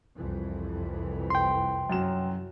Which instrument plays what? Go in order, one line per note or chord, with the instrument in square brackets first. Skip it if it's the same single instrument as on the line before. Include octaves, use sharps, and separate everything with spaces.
[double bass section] C2 F2 E3
[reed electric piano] G5 C6
[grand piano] F#2 F#3 E7